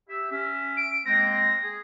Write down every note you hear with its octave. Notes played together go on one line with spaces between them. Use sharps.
G4 E5
C#4 E5
D7
G#3 A#3 C4 A#6
G#4